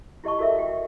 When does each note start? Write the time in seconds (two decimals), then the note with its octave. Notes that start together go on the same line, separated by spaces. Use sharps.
0.24 E4 G4 D#5 A5 C#6
0.39 F#4 A4 A#4 D#5 E5
0.56 F#4 G5